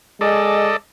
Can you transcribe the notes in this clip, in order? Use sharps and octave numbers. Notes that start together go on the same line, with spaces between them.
G#3 A4 D5 D#5